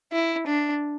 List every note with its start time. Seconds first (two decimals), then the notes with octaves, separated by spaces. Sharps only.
0.12 E4
0.47 D4